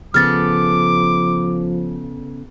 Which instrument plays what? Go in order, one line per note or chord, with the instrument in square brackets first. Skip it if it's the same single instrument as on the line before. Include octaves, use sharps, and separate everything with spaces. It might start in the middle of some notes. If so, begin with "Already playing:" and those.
[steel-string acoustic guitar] C#3 B3 A4 [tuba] F3 [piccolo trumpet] D6 [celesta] F6 A6